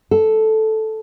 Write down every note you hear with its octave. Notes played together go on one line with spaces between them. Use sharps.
A4